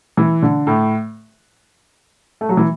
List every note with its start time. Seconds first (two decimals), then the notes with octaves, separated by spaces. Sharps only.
0.17 E3
0.42 D3
0.67 A2
2.41 A3
2.49 F#3
2.57 E3